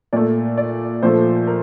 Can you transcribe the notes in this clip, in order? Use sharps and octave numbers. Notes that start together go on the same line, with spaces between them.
A#2 A3 D5
D5
A#2 F3 A3 C5
A#4